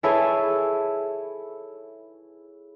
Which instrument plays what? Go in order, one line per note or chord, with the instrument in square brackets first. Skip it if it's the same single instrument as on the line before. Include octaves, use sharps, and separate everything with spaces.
[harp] E4 G#4 A4 B4 C#5 E5